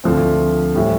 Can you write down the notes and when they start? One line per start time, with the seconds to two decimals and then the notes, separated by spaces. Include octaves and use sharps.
0.04 D2 D3 F3 A3 C4
0.75 A2 E3 G3